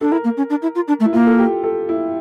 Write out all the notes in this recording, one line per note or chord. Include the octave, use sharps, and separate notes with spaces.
D4 A4
E4 A#4
A#3
C#4
D4
E4
F4
D4
A3
E4
A#3 F4
A4
G4
A4
E4